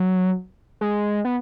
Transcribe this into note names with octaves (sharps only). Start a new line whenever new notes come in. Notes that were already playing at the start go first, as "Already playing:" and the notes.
Already playing: F#3
G#3
B3